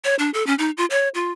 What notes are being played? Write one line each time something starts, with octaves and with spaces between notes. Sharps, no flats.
C#5
D4
A4
C#4
D#4
F4
C#5
F4